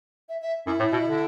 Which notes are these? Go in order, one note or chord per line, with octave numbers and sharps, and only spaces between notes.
E5
E5
F#2 E4
A2
B2
D3